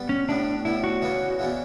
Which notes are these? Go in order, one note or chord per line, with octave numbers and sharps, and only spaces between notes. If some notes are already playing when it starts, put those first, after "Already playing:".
Already playing: G3 B3
C#4
A2 G3 B3 D4
A2 G3 B3 E4
F#4
C#3 E3 B3 D4
C#3 E3 B3 D4